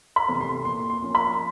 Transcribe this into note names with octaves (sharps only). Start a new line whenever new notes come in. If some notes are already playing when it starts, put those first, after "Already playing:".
B5
C3 E3 A3 C4
C6
A#2 C6
C6
F3 A#3 C#4
B5